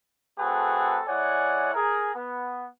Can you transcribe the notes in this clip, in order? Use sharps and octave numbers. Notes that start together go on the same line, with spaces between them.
A3 C4 F#4 G#4 A4 B4
G#3 E4 C#5 D5 F#5 G#5
G#4 A#4
B3